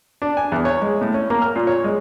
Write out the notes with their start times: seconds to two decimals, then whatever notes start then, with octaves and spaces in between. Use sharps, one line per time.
0.22 D4
0.37 G#5
0.52 E2
0.65 C#5
0.82 G#3
1.01 A2
1.14 C#4
1.30 A#3
1.42 F6
1.56 A#2
1.67 C#5
1.84 G#3